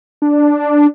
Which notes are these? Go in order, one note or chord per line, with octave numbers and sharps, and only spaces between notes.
D4